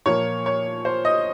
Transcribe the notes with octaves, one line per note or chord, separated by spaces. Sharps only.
A#2 F3 A#3 C#5
C#5
C5
D#5